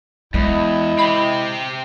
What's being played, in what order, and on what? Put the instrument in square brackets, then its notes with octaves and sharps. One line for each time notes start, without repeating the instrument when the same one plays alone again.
[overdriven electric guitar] E2 [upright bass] G#3 [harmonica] E4 D#5
[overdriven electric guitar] C4 G4 [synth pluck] B5